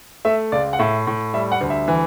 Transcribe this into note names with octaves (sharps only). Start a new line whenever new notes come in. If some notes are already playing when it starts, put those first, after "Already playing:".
A3 E5
C#2 D5
F#5
A2 E5
A2
G3 E5
F#5
D2
E5
E3